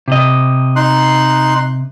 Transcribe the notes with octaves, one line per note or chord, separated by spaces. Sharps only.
C3 D#5
D#4 C6 F#6